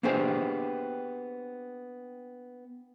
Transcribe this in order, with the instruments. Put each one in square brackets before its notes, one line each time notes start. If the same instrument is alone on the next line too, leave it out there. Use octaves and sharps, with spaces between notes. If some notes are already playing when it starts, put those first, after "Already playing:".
[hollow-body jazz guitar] A#3 B3 D4 G4 G#4 C5